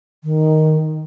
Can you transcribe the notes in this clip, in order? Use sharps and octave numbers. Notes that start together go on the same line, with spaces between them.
D#3